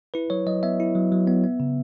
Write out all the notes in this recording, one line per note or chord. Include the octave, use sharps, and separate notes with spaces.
E4 B4
F#3 C#5
F#3 D#5
B3 E5
E4
F#3
F#3
B3
B3
C#3